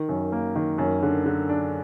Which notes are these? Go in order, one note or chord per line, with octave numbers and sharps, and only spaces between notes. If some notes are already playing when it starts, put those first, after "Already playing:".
Already playing: D#3
F#2
A#3
D#3
F#2
D3
D3
D4